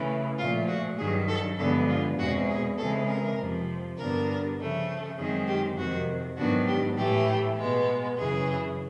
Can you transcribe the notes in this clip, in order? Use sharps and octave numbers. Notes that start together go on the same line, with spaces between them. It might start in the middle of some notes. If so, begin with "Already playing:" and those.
Already playing: C#3 E3 A3
A#2 F3 A3 F4
F#4
G2 D#3 F#3 G#4
A4
G2 D3 F3 G#3 B3 A4
F4
E2 B2 G#3 C4 F#4
G#4
C#3 E3 G#3 C4 A4
A#4
F2 C3 F3
G2 D3 G3 B3 D4 A#4
C#3 F3 A3
F#2 D#3 G#3 C4 G#4
G4
F2 C3 D#3 F#4
G#2 D#3 F#3 B3 D4 F#4
G4
A2 E3 A3 G4
B2 G#3 B3
F#2 C#3 E3 G#4